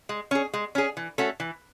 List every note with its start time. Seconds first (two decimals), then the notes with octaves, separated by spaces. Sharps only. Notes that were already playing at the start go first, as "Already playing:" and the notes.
0.09 G#3
0.31 C#4 G#4
0.53 G#3
0.75 C#4 G#4
0.97 E3
1.18 A3 C#4 F#4 A4
1.40 E3